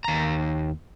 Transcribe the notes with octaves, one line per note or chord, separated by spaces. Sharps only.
D#2 A#5